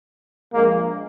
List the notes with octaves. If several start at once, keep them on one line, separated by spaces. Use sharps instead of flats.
A#1 A#2 G#3 A#3